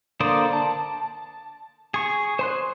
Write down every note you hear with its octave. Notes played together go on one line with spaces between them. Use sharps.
D3 A#3 C5 D5 D#6
A5
G#4 C#6
C5 C6 F#6